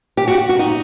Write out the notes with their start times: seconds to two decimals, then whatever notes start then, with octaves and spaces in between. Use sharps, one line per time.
0.17 G4
0.28 F#4
0.49 F#4
0.59 D#4